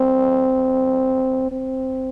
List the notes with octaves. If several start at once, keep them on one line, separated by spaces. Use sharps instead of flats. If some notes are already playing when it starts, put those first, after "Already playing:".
Already playing: C4
C4